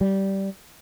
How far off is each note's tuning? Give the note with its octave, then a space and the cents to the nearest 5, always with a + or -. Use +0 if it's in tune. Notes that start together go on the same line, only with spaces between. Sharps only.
G3 -15